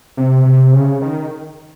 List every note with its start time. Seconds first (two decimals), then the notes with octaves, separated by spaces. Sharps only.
0.17 C3
0.45 C3
0.73 C#3
1.01 D#3